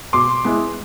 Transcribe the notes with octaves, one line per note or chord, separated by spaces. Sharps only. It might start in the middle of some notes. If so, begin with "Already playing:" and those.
B2 C6 D6
G#3 B3 E4